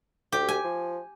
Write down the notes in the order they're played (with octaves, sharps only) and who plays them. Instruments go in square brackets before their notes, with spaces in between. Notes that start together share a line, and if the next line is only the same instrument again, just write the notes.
[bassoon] D2 [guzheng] G4
[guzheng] G#5
[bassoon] F3